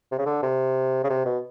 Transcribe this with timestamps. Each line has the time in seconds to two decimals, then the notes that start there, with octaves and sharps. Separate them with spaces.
0.12 C3
0.18 C#3
0.26 D3
0.43 C3
1.04 C#3
1.09 C3
1.25 B2